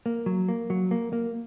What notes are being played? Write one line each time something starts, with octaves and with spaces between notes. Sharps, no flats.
A#3
F#3
A#3
F#3
A#3
A#3